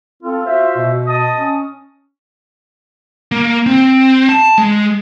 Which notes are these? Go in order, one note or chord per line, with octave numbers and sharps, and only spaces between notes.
C4 F4 A4
F#4 C5 E5
B2
D#5 A5 D#6
C#4
A#3
C4
A5
G#3